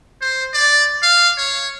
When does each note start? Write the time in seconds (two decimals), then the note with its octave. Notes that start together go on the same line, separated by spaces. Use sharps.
0.22 C5
0.53 D5
1.03 F5
1.37 C#5